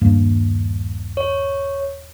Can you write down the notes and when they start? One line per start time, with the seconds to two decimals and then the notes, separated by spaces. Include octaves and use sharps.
0.01 D#1 G2 A#3
1.17 C#5